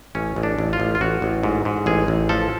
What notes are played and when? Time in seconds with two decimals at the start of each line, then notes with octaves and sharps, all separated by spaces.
0.15 A1 C#4
0.36 A1
0.43 D4
0.59 A1
0.73 F4
0.80 A1
0.95 F4
1.01 A1 F#4
1.22 A1
1.43 G#2
1.65 G#2
1.86 A1 G#4
2.08 A1
2.29 F3 A4